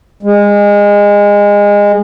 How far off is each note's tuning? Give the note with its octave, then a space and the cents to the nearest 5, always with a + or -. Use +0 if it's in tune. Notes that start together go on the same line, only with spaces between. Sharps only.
G#3 -25